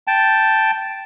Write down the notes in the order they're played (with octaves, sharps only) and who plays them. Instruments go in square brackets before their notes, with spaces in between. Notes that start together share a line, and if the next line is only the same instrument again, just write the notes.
[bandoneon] G5 A5